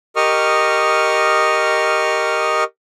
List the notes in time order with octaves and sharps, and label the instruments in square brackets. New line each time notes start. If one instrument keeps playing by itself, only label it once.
[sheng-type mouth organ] G4 A#4 D#5 C#6 D#6 F6